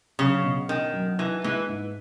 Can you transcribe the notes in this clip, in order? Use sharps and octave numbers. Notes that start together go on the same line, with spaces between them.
C#3 F#3
B2
D#3 C#4
F#3
E3 D#4
E3 G#3
G#2